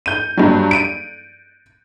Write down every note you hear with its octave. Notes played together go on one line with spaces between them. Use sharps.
G6 D#7
G2 F#3
D7 D#7